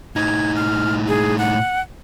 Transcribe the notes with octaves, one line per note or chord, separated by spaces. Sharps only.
A2 D#4 G#6
F6
G#4
F#5